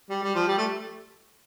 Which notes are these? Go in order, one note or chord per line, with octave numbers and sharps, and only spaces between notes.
G3
G3
F3
G3
A3